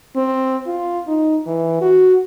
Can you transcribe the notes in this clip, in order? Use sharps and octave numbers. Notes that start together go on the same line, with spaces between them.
C4
F4
D#4
E3
F#4